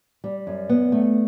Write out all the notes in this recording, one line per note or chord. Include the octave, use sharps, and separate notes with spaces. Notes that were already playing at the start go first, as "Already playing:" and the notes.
G3
F#2
B3
A3